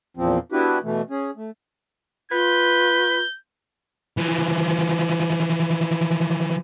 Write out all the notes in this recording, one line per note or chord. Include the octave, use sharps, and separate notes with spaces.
E2 A#2 F3 C4
B3 D4 E4 F#4 G4 B4
B2 E3 A3
C#4 G#4
A3
F4 B4 G6
E3 F3